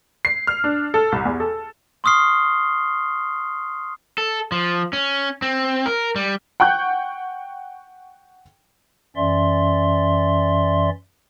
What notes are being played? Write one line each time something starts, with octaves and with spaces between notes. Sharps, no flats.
C7
F6
D4
A4
C2
E2
A4
C6 C#6 D#6 F6 C7 G7
A4
F3
C#4
C4
A#4
G3
F#5 G5 C#6 F#6 G6
F#2 E3 C#4 D5 E5 C6